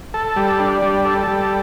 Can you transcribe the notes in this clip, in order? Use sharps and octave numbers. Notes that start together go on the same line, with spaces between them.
A4
G3
D4
G3
A4
G3